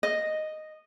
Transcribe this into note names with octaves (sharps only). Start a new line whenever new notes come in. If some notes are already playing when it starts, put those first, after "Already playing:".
D#5